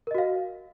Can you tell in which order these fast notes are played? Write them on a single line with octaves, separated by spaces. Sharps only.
A#4 D#5 F#4 F5